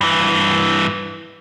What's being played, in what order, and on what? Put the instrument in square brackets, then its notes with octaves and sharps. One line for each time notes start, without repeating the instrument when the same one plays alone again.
[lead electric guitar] G2 E3